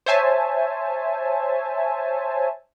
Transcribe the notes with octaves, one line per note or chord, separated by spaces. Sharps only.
C5 C#5 E5 G#5 A5